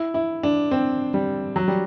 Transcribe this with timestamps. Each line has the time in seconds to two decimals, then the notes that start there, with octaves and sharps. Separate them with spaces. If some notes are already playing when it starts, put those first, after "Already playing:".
Already playing: E4
0.14 E4
0.43 D4
0.71 C4
1.14 G3
1.56 F#3
1.68 G3